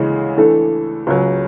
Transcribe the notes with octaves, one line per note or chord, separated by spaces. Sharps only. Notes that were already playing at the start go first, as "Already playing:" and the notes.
Already playing: D2 C#3 E3 G#3 C#4
E3 A3 D4 A4
C#2 C#3 F#3